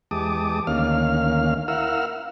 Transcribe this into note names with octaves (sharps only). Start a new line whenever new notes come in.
E2 G#3 G4 A5 D6 D#6
D2 D#3 A#3 C#4 F5 F6
E4 A#4 F5 F#5 E6 F6